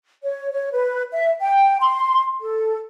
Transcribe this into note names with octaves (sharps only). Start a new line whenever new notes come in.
C#5
C#5
B4
E5
G5
C6
A4